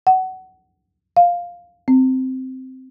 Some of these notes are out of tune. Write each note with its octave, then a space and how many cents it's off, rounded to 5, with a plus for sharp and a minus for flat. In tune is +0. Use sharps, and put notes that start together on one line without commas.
F#5 +20
F5 +5
C4 -10